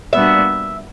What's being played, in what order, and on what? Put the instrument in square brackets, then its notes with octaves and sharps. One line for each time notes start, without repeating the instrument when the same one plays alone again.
[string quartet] A#2 G3 B3 D4 F#4 [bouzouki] E5